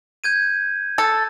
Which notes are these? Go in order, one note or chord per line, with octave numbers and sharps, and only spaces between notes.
G6 G#6 D#7
A4 A6